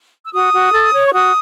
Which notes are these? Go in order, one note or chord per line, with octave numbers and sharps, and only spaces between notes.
E6
F#4 D#6
F#4
A4
C#5
C#6
F#4 D#6